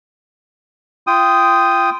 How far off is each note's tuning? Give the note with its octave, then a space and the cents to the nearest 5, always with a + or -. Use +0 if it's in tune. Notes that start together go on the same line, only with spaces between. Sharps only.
F4 -25 G5 +0 D#6 +0